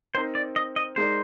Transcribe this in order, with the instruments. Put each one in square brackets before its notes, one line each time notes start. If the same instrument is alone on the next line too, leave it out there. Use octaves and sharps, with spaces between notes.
[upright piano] C4 D#4 A#4 [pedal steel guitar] C5
[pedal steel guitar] D5
D#5
D#5
[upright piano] G#3 D#4 A#4 D5 [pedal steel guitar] C5